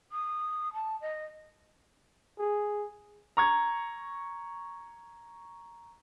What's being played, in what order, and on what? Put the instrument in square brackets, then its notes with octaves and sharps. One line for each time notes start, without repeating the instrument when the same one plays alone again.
[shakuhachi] D#6
A5
D#5
[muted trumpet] G#4
[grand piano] A#5 C#6 G#6